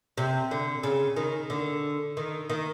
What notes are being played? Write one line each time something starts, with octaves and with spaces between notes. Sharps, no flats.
C3
D3
C#3
D#3
D3
D#3
D#3